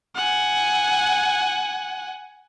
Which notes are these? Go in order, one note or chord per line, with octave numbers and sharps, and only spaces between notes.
F#5 G#5